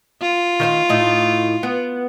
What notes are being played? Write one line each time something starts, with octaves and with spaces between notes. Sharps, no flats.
F4
D#3 C5 F5
A2 D#4 E4
B3